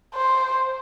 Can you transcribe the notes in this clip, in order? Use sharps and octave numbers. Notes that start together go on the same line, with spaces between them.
C5